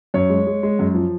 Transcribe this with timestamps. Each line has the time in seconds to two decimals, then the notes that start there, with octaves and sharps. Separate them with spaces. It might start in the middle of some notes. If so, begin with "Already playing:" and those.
0.14 F#2 C#5
0.30 G#3
0.47 G#3
0.63 G#3
0.79 F#2
0.95 F3